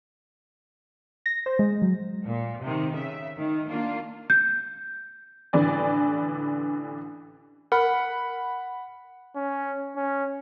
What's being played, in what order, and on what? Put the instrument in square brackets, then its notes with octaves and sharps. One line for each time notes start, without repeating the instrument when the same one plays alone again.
[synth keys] A#6
C5
G#3
F#3
[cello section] A#2
C3 D#3
C#3 E5
D#3
A#3 D4 F4
[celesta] G6
[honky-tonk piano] A1 D3 E3 D5 G#5
[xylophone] A#4 [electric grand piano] F#5 B5
[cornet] C#4
C#4